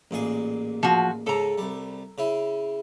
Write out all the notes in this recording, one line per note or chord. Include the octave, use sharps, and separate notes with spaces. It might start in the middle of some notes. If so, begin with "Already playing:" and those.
A1 A#2 G#4
F3 F#4
G#2 C#3 A4 A#5
C2 G3
C#3 E4